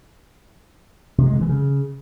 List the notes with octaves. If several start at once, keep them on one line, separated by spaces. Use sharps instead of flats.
C3
G#3
D3
E3
C#3